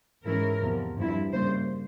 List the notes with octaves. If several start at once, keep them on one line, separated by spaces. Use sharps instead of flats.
G#2 E3 G#3 C#4 E4 A#4
E2 C3 F3
G2 F3 C4 E4
C#3 G3 A#3 C5